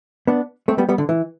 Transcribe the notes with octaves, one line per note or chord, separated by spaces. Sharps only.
B3 D4
A3 C4
G3 B3
G3 B3
D3
E3